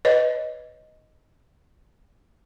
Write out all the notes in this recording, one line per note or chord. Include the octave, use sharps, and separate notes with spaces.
B4 C#5 D#5